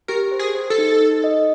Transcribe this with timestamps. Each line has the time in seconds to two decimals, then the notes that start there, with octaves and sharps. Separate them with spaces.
0.08 G4 A#4
0.32 C5
0.39 G#4
0.55 C5
0.70 A4
0.78 D#4
1.01 D#4
1.24 D#5